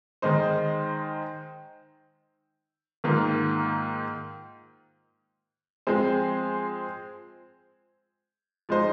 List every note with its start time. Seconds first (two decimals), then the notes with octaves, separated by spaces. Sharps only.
0.22 D#3 G#3 D#4 C5
3.04 G#2 D#3 A#3 F4
5.87 F3 G#3 C4 G#4 C5
8.69 F3 G#3 D#4 C5